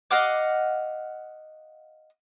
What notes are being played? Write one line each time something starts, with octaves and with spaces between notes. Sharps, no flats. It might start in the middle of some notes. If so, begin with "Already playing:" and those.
D#5 F5 F#5 D6